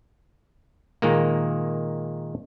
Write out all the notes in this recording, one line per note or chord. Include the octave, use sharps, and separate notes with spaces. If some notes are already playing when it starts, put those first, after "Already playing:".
A#2 D#3 G#3 A#3